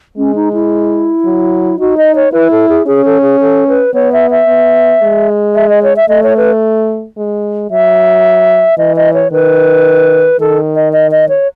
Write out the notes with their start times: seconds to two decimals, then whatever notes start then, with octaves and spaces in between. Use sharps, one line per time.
0.17 G#3 C#4
0.35 D#4
0.53 E4
1.25 F#3
1.79 D#4 F#4
1.97 D#5
2.15 C#5
2.32 E4 B4
2.51 A4
2.69 G#4
2.87 C#4 G#4
3.05 A4
3.22 G#4
3.40 A4
3.68 B4
3.94 B3 C#5
4.13 E5
4.31 E5
4.48 B3
5.02 G#3
5.55 E5
5.69 D#5
5.83 C#5
5.96 E5
6.09 A3 D#5
6.23 C#5
6.37 B4
7.17 G#3
7.70 F#3 E5
8.78 E3 D#5
8.96 D#5
9.14 C#5
9.32 D#3 B4
10.40 D#3 A4
10.76 D#5
10.93 D#5
11.11 D#5
11.29 C#5